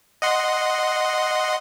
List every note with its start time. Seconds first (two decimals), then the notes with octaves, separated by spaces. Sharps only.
0.22 D#5 F#5 C6